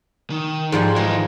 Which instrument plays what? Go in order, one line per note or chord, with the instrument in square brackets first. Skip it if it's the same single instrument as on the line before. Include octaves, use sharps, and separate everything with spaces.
[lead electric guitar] D#3
[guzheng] G#2 F3 G3
[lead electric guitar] D#3 E3 [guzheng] G#3